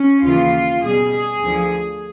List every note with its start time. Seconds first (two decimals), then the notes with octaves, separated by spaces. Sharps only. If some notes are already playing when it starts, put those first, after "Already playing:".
Already playing: C#4
0.24 D#2 C#3 E3 F4
0.83 B2 G3 G#4
1.42 D2 D3 F3